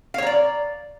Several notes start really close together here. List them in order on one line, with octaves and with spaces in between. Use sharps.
F5 C#5 A#5 D5